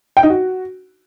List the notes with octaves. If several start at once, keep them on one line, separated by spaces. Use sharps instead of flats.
G5
D#4
F#4